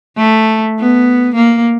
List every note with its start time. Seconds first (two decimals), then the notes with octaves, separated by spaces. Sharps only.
0.17 A3
0.80 B3
1.35 A#3